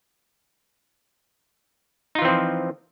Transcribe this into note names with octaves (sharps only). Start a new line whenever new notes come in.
E3 F3 C4 D#4 F4